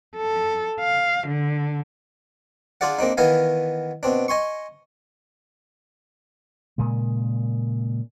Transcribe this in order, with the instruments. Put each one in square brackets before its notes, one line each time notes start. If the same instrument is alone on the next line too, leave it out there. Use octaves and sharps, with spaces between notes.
[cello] A4
F5
D3
[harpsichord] D4 F4 G#4 D5 F#5
A#3 C4 D4 D#4
D#3 E3 B3 D#5 F5 G#5
B2 C4 D4
D#5 G#5 C6 C#6
[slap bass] A#2 C#3 G#3